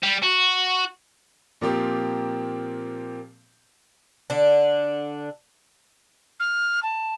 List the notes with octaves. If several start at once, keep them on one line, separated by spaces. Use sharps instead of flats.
G3
F#4
A#2 F3 A#3 C4 G4
D3 D4
F6
A5